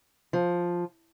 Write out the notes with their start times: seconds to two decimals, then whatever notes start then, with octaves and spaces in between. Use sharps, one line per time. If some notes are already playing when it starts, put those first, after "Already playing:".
0.33 F3